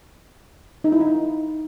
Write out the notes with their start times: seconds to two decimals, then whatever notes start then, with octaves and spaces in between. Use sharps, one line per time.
0.84 D#4
0.92 E4
1.00 D#4